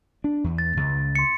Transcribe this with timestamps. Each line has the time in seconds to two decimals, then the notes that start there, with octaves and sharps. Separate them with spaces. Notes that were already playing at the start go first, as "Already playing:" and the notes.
0.24 D4
0.44 E2
0.58 A6
0.77 C#2
1.15 C6 C#7